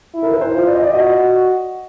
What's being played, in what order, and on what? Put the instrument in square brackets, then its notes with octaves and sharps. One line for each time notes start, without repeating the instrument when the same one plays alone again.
[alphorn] E4
[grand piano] A#4
B4
C5
[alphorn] F4
[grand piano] D5
D#5
D5
[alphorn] F#4 [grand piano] D#5